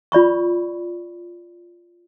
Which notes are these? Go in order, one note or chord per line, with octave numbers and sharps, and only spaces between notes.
F4 D5 B5 C#6